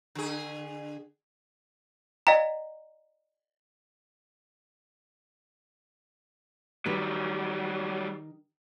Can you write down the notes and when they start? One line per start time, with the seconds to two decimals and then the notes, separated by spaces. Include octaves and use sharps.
0.15 D3 G#4
2.27 D5 D#5 F5 G5 A#5
6.86 D#3 F#3 G3 G4 B4